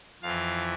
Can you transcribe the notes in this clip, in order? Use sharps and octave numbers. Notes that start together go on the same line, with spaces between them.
F2 E3 F5